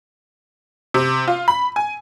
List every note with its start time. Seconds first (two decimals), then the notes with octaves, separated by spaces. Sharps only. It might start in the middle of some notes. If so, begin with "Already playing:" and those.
0.94 C3
1.28 F4
1.48 B5
1.76 G#5